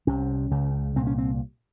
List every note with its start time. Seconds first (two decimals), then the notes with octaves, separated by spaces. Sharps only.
0.07 C2 C3 C#4
0.51 C#2 C#3
0.96 C2 A#2 C4
1.07 C#4
1.18 C4